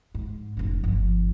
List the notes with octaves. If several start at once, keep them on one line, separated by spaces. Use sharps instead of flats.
G#2
F1 C#4
G1 F3